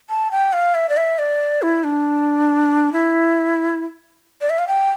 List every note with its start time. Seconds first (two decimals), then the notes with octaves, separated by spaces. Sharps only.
0.09 A5
0.31 G5
0.53 F5
0.75 E5
0.89 D5
0.97 E5
1.19 D5
1.62 E4
1.84 D4
2.93 E4
4.41 D5
4.50 E5
4.59 F5
4.68 G5